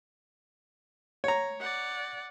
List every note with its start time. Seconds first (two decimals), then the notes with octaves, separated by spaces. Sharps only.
1.24 C#5 A#5
1.60 D5 F#5